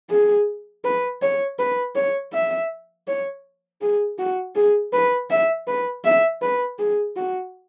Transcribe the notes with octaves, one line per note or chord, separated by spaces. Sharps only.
G#4
B4
C#5
B4
C#5
E5
C#5
G#4
F#4
G#4
B4
E5
B4
E5
B4
G#4
F#4